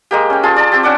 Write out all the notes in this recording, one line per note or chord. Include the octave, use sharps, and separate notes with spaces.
G#3 A#3 G4
C#4 G5
F4 G#4 A5 C6
D5 A5
C4 G4
C#4 D4 F#5 D6